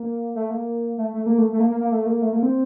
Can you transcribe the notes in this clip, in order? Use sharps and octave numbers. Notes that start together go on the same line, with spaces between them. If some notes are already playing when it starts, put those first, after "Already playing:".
Already playing: A#3
A3
A#3
A3
A3
A#3
A3
A3
A#3
A#3
A#3
A3
A#3
A3
A#3
C4